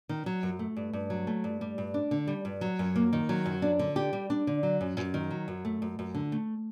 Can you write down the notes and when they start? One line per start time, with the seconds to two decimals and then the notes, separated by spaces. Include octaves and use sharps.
0.09 D#3
0.26 F#3
0.43 F#2
0.59 A3
0.76 G2
0.93 G2
1.10 F#3
1.27 A3
1.44 G2
1.61 G3
1.78 G2
1.94 D4
2.11 D3
2.27 G3
2.45 G2
2.61 F#3
2.79 F#2
2.96 A#3
3.13 D#3
3.29 F#3
3.46 F#2
3.62 D4
3.79 D3
3.96 G4
4.13 G3
4.30 D4
4.47 D3
4.63 F#3
4.81 F#2
4.97 F#2
5.14 D#3
5.31 F#3
5.48 F#2
5.65 A3
5.82 F#2
5.99 F#2
6.14 D3
6.32 A3